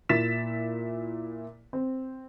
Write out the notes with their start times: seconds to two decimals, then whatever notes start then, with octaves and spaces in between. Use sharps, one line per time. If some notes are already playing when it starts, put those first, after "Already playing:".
0.09 A#2 E4 A6 B6 E7
1.73 C4